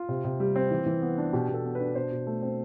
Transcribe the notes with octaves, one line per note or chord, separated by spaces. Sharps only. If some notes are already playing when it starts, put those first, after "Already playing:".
Already playing: F4
C3
C3
G3
C4
E3
E3
B3
D4
B2 G4
B2 A4
B3
B4
D4
B2 C5
B2
A3
C4